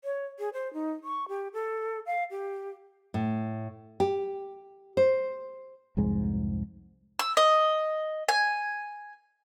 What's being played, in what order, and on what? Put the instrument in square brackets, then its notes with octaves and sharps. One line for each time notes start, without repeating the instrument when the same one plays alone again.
[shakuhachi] C#5
G#4
C5
D#4
C#6
G4
A4
F5
G4
[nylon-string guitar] A2
G4
C5
[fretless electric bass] C2 F2 G#2 G#3
[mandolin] E6
D#5
G#5